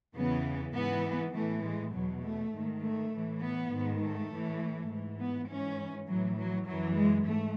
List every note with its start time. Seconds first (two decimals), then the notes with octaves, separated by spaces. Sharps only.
0.15 E2 C#3 E3 B3
0.74 G#2 E3 B3
1.34 A2 E3 A3
1.63 G#3
1.94 E2 B2 F#3
2.23 A3
2.53 G#2 D#3
2.82 A3
3.12 A2 E3
3.40 B3
3.70 G#2 D#3
4.00 A3
4.30 A2 E3
4.89 G#2 E3
5.19 B3
5.48 G#2 E3 C#4
6.07 A2 E3 F#3
6.37 F#3
6.66 F#2 E3 F#3
6.96 G#3
7.27 G#2 A3